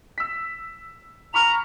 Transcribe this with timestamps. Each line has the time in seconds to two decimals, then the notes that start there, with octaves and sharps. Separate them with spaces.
0.18 E6 B6
1.34 A#5 B5 C#6 F6 F7